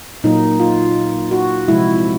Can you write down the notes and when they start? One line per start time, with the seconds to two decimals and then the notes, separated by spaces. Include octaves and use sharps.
0.24 A#2 F#3 A#3 D#4
0.60 F4
1.31 F#4
1.68 C3 F3 G#3 E4